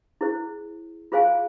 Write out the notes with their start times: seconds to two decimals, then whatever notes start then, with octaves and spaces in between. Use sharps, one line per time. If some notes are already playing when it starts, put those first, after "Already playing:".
0.21 E4 G#4 C5
1.12 F4 G#4 C5 F5 G#5